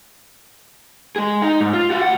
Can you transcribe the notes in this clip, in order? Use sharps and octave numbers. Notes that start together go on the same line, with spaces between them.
G#3 G#4
D#4
G#2
F4
F#4 F5
D2 F#5